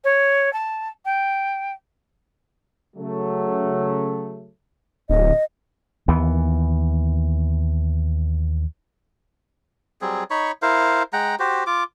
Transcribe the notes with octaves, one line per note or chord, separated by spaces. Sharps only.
C#5
A5
G5
C#3 F#3 A3
D1 D#5
D#2 E3 B3
F#3 G3 C4 G#4
D#4 C#5 B5 C#6
E4 A#4 C5 F5
G#3 F#5 G5 A#5
F#4 G4 C5
F4 D6